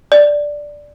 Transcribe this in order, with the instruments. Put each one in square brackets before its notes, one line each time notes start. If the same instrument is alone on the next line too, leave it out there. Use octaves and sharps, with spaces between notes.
[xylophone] D5